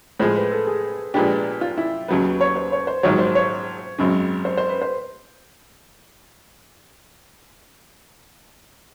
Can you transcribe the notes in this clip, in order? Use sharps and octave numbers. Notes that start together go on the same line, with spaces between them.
A2 F3 G#3 C5
B4
A4
G#4
A#2 F3 G#3 B3 D4 G4
F4
E4
D#2 C#3 F#3 B3 B4
C#5
C5
C#5
C5
A#1 G#2 D#3 F#3 C#5
C5
C#5
G#1 F#2 C#3
C5
C5
B4
C5